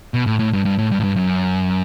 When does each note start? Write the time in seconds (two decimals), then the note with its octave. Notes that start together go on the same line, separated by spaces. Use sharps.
0.14 B2
0.26 A2
0.40 A2
0.53 G2
0.65 G2
0.78 A2
0.92 G2
1.00 A2
1.03 G2
1.16 F#2